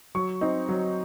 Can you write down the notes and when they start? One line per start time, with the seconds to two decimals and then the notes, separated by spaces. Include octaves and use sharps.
0.15 F#3 C#6
0.41 C4 D#4
0.69 F#3